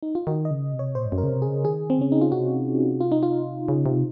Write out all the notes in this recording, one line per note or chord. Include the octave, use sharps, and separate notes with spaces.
D#4
F4
D#3 F#4
D#5
C#3
C3
C#5
A#2 C5
G#2
F#2
A#4
C#3
C3
G#4
C#3
D#3 G#4
C4
C#3 C#4
D#4
F4
C3 F#4
F4
D#4
F4
C#3
C3